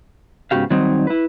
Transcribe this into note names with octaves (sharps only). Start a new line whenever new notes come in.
G#2 C#3 B3 F#4 G4 F5
D#3 F#3 G3 C4 D#4
E4 B4